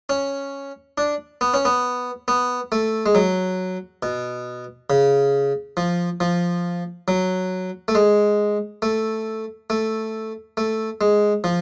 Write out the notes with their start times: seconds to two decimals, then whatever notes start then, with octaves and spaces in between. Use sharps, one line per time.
0.09 C#4
0.98 D4
1.41 B3
1.54 C#4
1.65 B3
2.28 B3
2.72 A3
3.06 G#3
3.15 F#3
4.03 B2
4.90 C#3
5.77 F3
6.20 F3
7.08 F#3
7.88 A3
7.95 G#3
8.82 A3
9.70 A3
10.57 A3
11.01 G#3
11.44 F3